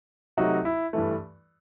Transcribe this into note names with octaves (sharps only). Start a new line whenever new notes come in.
C3 F#3 A3 D#4 F#4
E4
G2 E3 A3